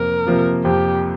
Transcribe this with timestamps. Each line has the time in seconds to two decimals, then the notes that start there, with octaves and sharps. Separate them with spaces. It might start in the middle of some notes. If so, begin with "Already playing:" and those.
Already playing: F2 C3 F3 A#3 A#4
0.27 C3 F3 A#3
0.65 F2 G4